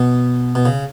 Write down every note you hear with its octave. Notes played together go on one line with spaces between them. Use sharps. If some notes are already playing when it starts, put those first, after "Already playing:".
Already playing: B2
B2
C#3